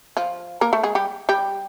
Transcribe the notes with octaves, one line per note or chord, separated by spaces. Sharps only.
F3 F4
A#3 A#4
A3 A4
G#3 G#4
G3 G4
G3 G4